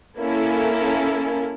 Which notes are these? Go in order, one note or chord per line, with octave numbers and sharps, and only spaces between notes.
A#3 C#4 E4 A4